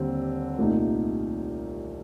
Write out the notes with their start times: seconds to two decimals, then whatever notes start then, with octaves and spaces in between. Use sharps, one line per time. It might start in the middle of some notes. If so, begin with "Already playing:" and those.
Already playing: D#2 D3 G3 C4
0.58 C2 A#2 A3 D#4